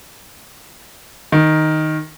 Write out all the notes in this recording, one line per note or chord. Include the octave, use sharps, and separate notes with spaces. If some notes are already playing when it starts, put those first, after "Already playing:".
D#3